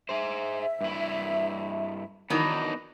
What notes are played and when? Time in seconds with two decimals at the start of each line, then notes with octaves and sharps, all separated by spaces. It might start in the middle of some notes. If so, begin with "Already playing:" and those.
0.09 G#4 C5 E5
0.81 G2 E4
2.30 D#3 E3 F#3 B3 D4 D#4